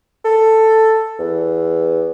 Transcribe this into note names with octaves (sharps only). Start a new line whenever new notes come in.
A4
E2